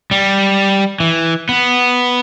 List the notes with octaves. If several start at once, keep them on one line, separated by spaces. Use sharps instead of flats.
G3
E3
B3